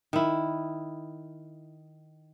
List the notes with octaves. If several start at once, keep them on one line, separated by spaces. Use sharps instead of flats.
D#3 E4